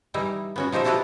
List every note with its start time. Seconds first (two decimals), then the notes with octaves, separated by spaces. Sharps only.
0.14 E3 G3 D#4 E4
0.56 B3 C#4 F#4
0.72 F3 D#4 G4 C5 E5
0.84 D4 E4 F#4 G4 A4 B4